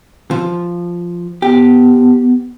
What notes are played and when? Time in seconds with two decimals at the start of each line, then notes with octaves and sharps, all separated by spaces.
0.31 F3
1.42 B3 G4